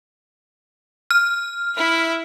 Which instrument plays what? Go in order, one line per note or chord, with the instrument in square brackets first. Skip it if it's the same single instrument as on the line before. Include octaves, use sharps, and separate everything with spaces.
[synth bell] F6
[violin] E4 E5